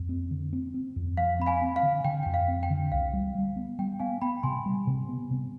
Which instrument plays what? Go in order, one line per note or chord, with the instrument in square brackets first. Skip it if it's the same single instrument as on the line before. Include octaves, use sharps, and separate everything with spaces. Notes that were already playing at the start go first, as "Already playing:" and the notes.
Already playing: [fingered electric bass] F2
C4
D3
C4
C4
F2
[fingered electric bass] F3 [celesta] F5
[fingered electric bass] C4 [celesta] B5
[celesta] F5 G#5
[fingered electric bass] C4
[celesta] F5
[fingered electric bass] D3
[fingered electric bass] D3 [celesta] G5
[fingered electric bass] F2 [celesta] G5
[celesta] F5
[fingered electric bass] C4
[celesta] G5
[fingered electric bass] D3
[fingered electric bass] C2 [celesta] F5
[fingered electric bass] G3
G3
B3
[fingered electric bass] G3 [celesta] G5
[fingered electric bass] B3 [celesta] F5 G#5
[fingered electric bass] B3 [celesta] G5 B5
[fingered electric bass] C3 [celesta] G#5 C6
[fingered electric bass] G3
C3
B3
C3